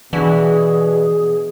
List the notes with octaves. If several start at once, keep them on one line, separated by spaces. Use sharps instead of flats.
B2 E3 D4 F#4 G#4 F#5